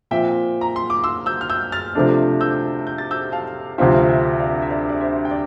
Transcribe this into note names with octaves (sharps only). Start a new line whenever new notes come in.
A#2 F3 C4 E5 G5
A#5
C6
D6
C6 E6
E6 G6
F6
E6 G6
F6 A6
C3 F3 A3 D4
E6 G6
G6
A6
E6 G6
F5 A5
D2 C3 F3 C4 F4 E5 G5
E5 G5
D5 F5
E5
D5 F5
D5
C5 E5
G5
D5